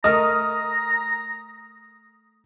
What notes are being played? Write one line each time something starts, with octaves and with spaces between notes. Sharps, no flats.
A3 A#4 D#5 A#5 D#6 F6